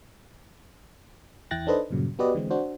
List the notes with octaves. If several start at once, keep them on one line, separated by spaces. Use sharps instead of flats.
E2 E4 G5 F#6 A6 A#6
D4 D#4 A4 B4 C5 D#5
G2 A#2 C#3 F#3
B3 F#4 G4 B4 D5 D#5
D3 E3 G#3 C4
D4 F#4 C5